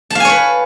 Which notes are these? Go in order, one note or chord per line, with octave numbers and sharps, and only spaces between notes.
B4 C#5 F5 G#5 A5